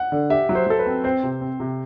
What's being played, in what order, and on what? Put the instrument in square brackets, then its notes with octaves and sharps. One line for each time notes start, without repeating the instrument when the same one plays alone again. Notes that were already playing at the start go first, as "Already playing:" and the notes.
Already playing: [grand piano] F#5
[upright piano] D3
[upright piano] G4 [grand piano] E5
[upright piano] F#3
[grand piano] C5
[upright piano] F#3 [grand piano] A4
[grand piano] B4
[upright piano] C4
[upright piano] C4 [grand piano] C5
[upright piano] C3
C4
C3